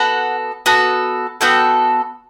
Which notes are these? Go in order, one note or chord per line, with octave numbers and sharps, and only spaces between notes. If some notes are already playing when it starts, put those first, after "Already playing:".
Already playing: B3 F#4 A4 F#5
B3 F#4 A4
B3 F#4 A4 G5